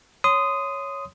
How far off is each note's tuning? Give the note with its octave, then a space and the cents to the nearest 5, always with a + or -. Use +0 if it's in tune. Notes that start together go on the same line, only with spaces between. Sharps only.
C#5 +0 C6 -25 D#6 +0